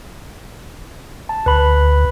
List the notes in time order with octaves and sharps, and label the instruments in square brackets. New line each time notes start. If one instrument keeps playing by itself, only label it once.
[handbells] A5
[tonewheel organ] D2 [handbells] B4 B5